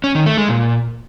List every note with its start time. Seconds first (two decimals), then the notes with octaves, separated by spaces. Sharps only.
0.04 C#4
0.15 D#3
0.26 A3
0.38 G#3
0.49 A#2